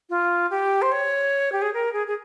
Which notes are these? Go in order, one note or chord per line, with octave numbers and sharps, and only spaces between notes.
F4
G4
C5
C#5
G4
G#4
A#4
G#4
G#4